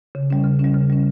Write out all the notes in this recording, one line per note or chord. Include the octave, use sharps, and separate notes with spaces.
C#3
G3 C#4
C#3
C#4
G3
C#3
G3 C#4